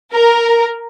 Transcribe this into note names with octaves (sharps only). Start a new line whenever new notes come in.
A#4